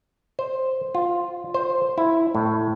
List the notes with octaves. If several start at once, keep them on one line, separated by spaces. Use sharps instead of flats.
C5
F4
C5
E4
A2